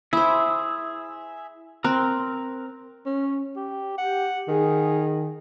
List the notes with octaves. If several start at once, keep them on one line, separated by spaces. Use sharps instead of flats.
E4 G#4 C5 E5
C4 A#4 A#5 F#6
C#4
G4
G4 F#5
D#3 G#4